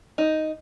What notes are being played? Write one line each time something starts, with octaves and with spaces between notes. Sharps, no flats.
D#4